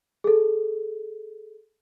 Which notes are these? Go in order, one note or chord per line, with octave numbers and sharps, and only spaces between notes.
G#4 A4